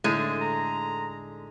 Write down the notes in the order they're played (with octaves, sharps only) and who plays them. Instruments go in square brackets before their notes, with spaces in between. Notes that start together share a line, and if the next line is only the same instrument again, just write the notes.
[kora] A2 D#4 [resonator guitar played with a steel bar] D3 G#3
[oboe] A#5